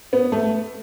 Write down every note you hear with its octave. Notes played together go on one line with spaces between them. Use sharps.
B3
A3